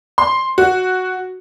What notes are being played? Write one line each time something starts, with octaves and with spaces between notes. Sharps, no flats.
C6
F#4